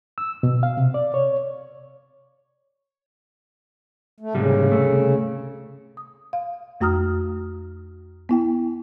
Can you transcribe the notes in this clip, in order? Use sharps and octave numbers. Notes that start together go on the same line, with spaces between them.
E6
B2
F5
C3
D5
C#5
A3
C2 G#2 C#3 G3
C2 A3
D#6
F5
F2 A3 F#4 A#5 D#6 F6
B3 E4 G5